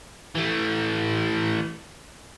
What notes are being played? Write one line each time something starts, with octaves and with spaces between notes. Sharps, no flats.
E3 A3